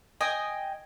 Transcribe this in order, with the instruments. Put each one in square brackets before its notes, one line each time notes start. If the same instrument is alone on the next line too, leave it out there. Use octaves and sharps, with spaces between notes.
[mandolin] D#5 G5 G#5 D#6